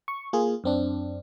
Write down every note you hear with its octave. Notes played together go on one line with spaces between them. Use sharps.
C#6
A#3 F4 G#4
F#2 C4 D4